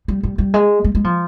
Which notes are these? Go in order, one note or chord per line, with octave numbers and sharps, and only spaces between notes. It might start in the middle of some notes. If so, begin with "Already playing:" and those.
G3
G3
G3
G#3
G#3
G#3
F3